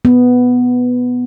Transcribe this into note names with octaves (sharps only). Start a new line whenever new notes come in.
B3